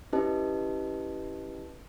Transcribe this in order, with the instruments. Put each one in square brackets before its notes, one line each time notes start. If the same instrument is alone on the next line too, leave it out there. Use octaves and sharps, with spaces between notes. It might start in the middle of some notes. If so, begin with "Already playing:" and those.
[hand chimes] C#4 E4 G4 B4 D#5 A5